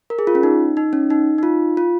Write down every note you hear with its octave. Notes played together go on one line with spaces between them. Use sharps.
A#4
G#4
F4
C#4
D#4
D#4
C#4
D#4
D#4
F4
F4